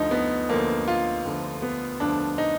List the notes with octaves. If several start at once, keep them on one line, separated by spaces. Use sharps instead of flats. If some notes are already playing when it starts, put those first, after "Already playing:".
Already playing: D2 D3 F3 D#4
B3
D2 D3 F3 A#3
F4
D2 D3 F3
B3
D2 D3 F3 D4
D#4